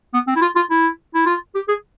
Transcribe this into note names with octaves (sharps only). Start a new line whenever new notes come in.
B3
C4
E4
F4
F4
E4
E4
F4
G4
G#4